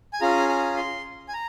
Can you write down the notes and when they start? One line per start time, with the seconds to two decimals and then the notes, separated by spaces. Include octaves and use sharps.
0.13 G#5
0.21 C#4 F4 G#4 A#5
0.49 A#5
0.77 C6
1.28 G#5
1.33 A#5